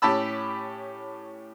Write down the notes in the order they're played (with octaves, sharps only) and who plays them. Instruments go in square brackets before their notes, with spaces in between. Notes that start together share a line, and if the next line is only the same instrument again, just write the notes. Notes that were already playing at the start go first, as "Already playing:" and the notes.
[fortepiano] A2 C#4 G4 A5 B5 E6